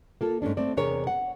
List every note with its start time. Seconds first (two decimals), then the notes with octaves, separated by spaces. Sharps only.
0.21 A#3 F4 A4
0.42 G#2 A3 C#4 D4
0.57 A3 C4 D5
0.77 E2 C3 D4 G#4 A#4 C#5
1.07 F#5